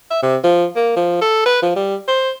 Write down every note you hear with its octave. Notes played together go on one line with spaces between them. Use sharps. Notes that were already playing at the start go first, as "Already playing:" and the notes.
E5
C3
F3
A#3
F3
A4
B4
F3
G3
C5